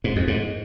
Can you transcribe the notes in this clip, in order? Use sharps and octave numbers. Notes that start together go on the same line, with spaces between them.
G#2
F2
G#2